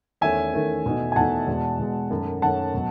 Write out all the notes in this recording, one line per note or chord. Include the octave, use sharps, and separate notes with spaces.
E2 D#3 A3 C#4 E5 G#5
E2 D#3 A3 C#4
E2 B2 A3 D#4
G#5
E2 B2 A3 D#4 F#5 A5
E2 B2 G#3
E2 B2 G#3
F#2 D#3 A3 C#4
F#2 D#3 A3 C#4 F#5 A5
B2 F#3